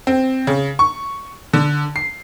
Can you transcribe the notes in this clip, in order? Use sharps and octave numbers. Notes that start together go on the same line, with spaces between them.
C4
C#3
C#6
D3
C7